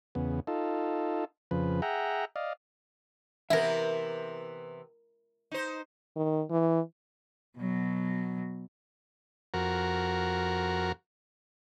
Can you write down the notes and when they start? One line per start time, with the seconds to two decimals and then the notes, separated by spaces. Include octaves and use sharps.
0.15 E2 C#3 B3
0.47 D#4 F4 A4
1.51 F2 C#3 F3 B4
1.82 G#4 E5 F#5 G5 A#5
2.36 D5 D#5 F5
3.50 C3 E3 B3 E4 A#4 E5
5.51 D#4 C5
6.17 D#3
6.51 E3
7.58 B2 F#3
9.54 F2 F#4 A#4